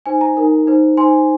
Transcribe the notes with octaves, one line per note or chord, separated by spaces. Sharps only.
D#4 C5 G#5
A#5
D#4 A#4
D#4 C5
D#4 C5 G#5 C6